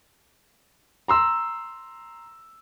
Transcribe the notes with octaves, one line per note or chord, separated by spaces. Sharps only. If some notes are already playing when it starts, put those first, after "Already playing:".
A#5 C6 E6